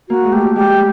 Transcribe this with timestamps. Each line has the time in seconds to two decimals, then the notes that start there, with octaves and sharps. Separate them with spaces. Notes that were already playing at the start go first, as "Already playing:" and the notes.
0.09 A#3 F#4
0.25 G#3
0.32 A3 G4
0.56 G#3 G4